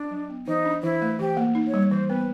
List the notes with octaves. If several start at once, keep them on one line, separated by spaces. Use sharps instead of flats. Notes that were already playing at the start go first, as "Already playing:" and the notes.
Already playing: D4
F#3
B3
E3 D#4
D4
E3 E4
A3
E3 G4
A#3
D#4
C#5
G3
E3 C5
B3 B4